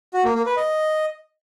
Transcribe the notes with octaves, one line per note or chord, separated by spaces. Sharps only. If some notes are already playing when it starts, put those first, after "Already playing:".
F#4
A#3
A#3
B4
D#5